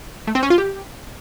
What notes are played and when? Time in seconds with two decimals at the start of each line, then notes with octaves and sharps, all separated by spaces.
0.27 A3
0.35 C4
0.43 C#4
0.50 F4
0.58 G4